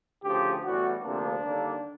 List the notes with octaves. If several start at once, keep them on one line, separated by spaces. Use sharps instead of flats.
D2 C#3 F3 G4
A2 E3 G3 B3 F#4
D2 C3 F3 A#3 D4
D#2 D3 G3 A#3